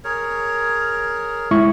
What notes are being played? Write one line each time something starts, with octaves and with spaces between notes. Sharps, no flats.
G#4 A#4 C#5
G#3 E4 B5 C#6